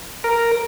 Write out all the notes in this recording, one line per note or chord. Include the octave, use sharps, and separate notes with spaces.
A#4